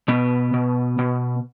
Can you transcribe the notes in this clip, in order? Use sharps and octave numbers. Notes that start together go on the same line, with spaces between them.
B2 B3
B2
B2